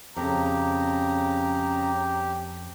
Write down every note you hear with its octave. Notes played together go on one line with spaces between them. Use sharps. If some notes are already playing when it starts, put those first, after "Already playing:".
F2 C#3 G4 A#5